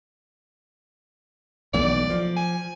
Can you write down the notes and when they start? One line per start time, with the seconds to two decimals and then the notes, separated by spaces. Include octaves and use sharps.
1.74 B1 E3 A3 D5
2.10 F3
2.37 G#5